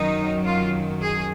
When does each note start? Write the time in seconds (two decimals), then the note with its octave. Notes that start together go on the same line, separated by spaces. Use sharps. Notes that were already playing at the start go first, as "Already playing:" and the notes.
Already playing: F#2 D#3 F#3 D#4
0.45 F4
1.01 G#4